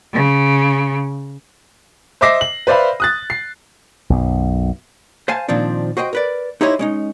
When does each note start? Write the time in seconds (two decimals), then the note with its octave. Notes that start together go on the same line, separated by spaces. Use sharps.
0.13 C#3
2.21 C5 D#5 E5 D6 A#6 C7
2.41 F#7
2.67 B4 C5 D5 E5 F5 B5
3.00 D#6 F#6 A6
3.30 C7
4.10 B1 F#2 B2
5.28 C5 F5 G#5 A5
5.48 A#2 D#3 F3 C4 D4
5.97 F#4 C5 D#5 G5
6.13 A#4 B4 D5
6.61 D#4 E4 G4 C5 C#5 D#5
6.79 G#3 C#4 D#4